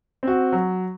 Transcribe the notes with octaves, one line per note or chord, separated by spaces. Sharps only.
C4 F#4
F#3